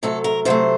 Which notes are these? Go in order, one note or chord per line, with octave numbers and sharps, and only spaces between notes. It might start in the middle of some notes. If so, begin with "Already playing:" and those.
C3 F#3 A3 A4
A#4
C3 F#3 A3 C5